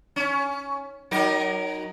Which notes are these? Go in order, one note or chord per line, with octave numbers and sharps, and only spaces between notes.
C#4
F#3 D#4 A#4